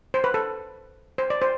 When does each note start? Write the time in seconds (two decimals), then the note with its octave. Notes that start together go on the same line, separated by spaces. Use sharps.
0.14 C5
0.24 B4
0.34 A4
1.18 C5
1.30 D5
1.42 C5